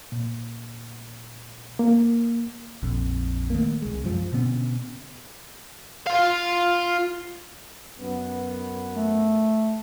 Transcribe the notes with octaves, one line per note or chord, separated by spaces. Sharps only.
A#2
A#3
A#1 F2
D#3 A3 A#3
C2 G#3
F#2 F3
B2 D3 B3 C#4
F4 F5
F#2 B3
A3